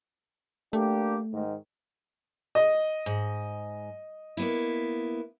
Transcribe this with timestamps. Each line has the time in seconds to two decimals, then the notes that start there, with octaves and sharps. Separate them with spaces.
0.73 A3 A#3 D4 G4
1.33 G#2 D#3
2.55 D#5
3.06 G#2
4.37 A#3 B3 E4